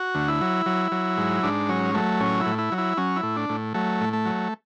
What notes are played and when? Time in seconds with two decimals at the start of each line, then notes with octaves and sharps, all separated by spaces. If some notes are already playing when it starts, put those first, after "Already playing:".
Already playing: F#4
0.15 D2
0.28 E4
0.41 F#3
0.66 F#3
0.92 F#3
1.17 G#2
1.43 G#2 D4
1.69 F#3 C#4
1.94 F#3 A3
2.20 A2 C#4
2.40 E4
2.46 A2
2.59 E4
2.72 F#3
2.78 E4
2.97 F#3 C#4
3.16 E4
3.23 A2
3.36 D4
3.49 A2
3.74 F#3 A3
4.01 A2
4.13 A3
4.25 F#3